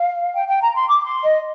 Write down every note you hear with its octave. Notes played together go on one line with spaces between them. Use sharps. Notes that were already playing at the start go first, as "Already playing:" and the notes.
Already playing: F5
G5
G5
A#5
C6
D6
C6
D#5